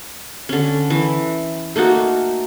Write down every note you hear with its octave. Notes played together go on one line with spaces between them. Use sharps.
D3 C#4
E3
A3 A#3 D#4 F#4